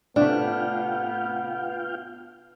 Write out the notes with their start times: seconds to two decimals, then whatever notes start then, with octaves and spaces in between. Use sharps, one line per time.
0.16 A2 C3 A3 B3 D4 F4 F5 G5